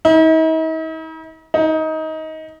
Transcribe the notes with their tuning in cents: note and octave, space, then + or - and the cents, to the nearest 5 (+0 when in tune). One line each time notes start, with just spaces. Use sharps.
D#4 +45
D#4 +20